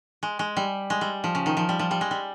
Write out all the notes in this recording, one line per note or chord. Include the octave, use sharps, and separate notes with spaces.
G#3
G#3
G3
G#3
G3
F3
C#3
D#3
F3
G3
F3
G3
G#3
G3